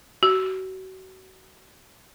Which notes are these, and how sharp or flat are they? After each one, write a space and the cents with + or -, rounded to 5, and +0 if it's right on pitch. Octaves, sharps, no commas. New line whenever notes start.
F#4 +30